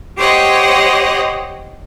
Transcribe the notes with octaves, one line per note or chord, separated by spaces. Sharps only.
G4 C5 C#5 D#5 F#5 G5